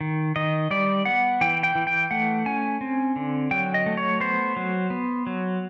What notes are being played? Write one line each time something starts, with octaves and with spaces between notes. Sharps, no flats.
D#3
D#3 D#5
G3 D5
B3 F#5
E3 G5
G5
E3
G5
A3 F#5
C#4 G#5
C4
D3
F#3 G5
D#5
A3
C#5
B3 C5
F#3
B3
F#3